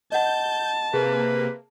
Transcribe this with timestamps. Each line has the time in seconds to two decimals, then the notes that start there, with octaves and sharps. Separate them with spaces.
0.12 D#5 F#5 A5 G6
0.94 C3 A#3 G#4 B4